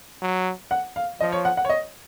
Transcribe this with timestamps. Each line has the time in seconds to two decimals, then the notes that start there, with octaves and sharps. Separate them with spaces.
0.22 F#3
0.71 F#5
0.96 F5
1.21 F3 D#5
1.32 C#5
1.45 F#5
1.57 F#5
1.65 C#5
1.69 D#5